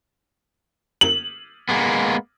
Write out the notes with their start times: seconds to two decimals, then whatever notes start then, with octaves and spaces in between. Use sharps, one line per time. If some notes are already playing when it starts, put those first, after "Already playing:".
1.01 F#7
1.69 G#3 A#3 B3